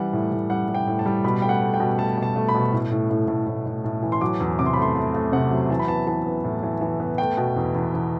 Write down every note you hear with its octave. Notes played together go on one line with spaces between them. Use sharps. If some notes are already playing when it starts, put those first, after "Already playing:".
Already playing: E3 G3 F#5
A2
A2
G3 F#5
G3
G5
A2
A5
G3
B2 B5
A3 G5
F#5
A3
G5
B2
A3 A5
B2
A5
A3
B5
B2
A2
A2
A2
A2
A2
A2
A2
E3
C6
F#3 D6
E2
C3 D6
C6
B5
A3 C6
A3
A3
C3 F#5
F#3
E3 A5
B5
B3 A5
E3 A5
B3
A2
E3
E3
B3
A3 G5
B2
E2
E2
E2